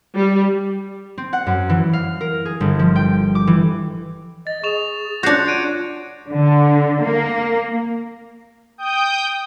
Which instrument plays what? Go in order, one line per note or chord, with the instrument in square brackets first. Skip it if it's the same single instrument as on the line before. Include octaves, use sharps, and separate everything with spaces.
[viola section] G3
[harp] C4
F#5
F#2
E3
F5
A#4
G#4
G1
F3
G5
D6
E3
[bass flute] D#5 [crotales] A6
[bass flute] G#4 [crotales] C#6 E7 F7
[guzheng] D4 F#4 [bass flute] F4 [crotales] G6 C7 C#7
[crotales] G#6 D7 D#7
[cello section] D3
A#3
[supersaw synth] G5 D#6 G6